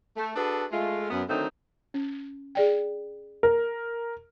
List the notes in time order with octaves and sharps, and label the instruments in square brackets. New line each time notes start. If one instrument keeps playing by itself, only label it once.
[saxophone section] A3
D4 F#4 G#4 A4 B4
G#3 A3 F4
F#2 B3
D3 D#3 F#3 A3 C4 D#4
[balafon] C#4
G#4 D5 G5
[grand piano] A#4